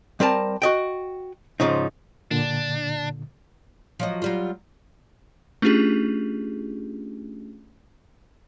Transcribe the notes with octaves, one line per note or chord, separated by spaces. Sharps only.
G3 C4 A#4 A5
F#4 D#5 G5
G#2 C#3 F3 D#4
A#2 D3 D4
F3 F#3 D#5
F#3 G3 F4
A3 C#4 D4 F4 G4 G#4